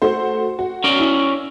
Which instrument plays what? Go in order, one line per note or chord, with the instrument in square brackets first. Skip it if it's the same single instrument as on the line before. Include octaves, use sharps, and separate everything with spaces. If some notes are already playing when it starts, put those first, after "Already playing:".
[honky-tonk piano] A3 F#4 C5
F#4
[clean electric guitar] C#4 A#4 D5
[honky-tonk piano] E4